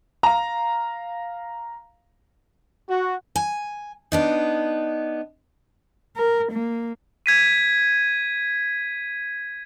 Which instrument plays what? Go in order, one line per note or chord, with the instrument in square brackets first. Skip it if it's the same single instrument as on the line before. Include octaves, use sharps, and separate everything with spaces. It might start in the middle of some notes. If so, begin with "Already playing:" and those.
[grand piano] F5 A#5
[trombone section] F#4
[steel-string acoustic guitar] G#5
B3 D4 D#4
[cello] A#4
A#3
[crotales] G#6 B6 D#7